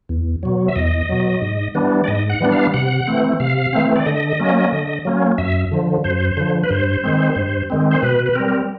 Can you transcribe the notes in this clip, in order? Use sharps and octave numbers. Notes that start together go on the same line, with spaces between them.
E2
B2 F#3
E5
E2 D#5
B2 F#3
G#2
E3 G3 B3 D4
D5
G#2 D#5
F#5
E3 G3 B3 D4
F5
C3 F#5
E3 A3 C4
C3 F5
E3 A3 C4
D5
D3 D#5
F#3 A#3 C#4
D3
F#3 A#3 C#4
F#2 E5
D3 F3
F#2 C5
D3 F3
B4
G2 C5
D#3 G#3 C4
G2
D#3 G#3 C4
C5
B2 B4
B4
G3 C4 A#4